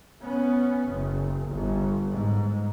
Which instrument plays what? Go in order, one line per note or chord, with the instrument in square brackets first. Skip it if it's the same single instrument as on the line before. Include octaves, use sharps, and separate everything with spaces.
[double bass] B3 C#4
F#1
G1
G#2